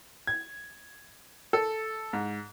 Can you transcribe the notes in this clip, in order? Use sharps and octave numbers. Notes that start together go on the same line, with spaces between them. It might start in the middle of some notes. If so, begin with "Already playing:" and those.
G#6
A4
G#2